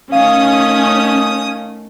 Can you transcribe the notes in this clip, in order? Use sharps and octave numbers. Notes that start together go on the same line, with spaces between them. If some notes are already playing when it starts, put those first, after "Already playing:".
D#3 A3 C#4 F5 D#6